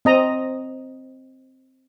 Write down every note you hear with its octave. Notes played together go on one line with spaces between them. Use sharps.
C4 D#5 A#5